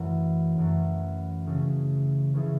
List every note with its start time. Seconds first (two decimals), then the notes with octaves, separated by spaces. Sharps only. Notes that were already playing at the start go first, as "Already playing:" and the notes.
Already playing: F#2 E3 A3 C#4
0.58 F#2 E3 A3 C#4
1.46 C#3 E3 A3 C#4 G#4
2.34 C#3 E3 A3 C#4 G#4